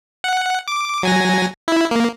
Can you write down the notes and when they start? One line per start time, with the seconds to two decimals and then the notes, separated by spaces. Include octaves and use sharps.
0.24 F#5
0.68 D6
1.03 F#3 G#5 A#6
1.68 E4
1.91 A#3